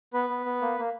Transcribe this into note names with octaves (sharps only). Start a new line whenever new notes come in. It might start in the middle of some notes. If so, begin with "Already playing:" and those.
B3 B4
B3
B3
A#3
A#3